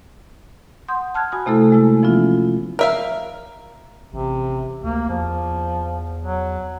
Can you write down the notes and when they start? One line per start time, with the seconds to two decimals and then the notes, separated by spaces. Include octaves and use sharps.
0.88 F#5 C6 D#6 G6
1.15 A5 F6 F#6 G#6
1.32 F#4 G#5 B5 D#6
1.46 C3 A3 E4 A4
1.72 G#3 A#3 E4
2.03 E3 F3 B3 C#4 F4
2.79 A#4 E5 F5
4.13 A1 C3
4.84 D2 A#3
5.10 E2 F3
6.24 F#3